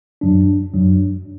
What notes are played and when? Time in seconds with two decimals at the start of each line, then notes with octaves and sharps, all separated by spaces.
0.21 F#2 F#3 D4
0.74 F#2 F#3 D4